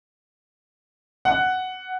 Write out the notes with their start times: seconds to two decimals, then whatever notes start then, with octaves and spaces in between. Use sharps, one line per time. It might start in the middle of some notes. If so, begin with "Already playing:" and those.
1.25 F#5